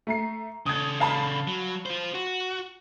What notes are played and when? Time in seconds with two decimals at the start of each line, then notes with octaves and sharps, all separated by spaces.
0.07 A3 A#5 C7
0.66 C#3 A4 D#6 G#6
1.00 F5 A5 B5
1.48 F#3
1.86 F4 C5
2.14 F#4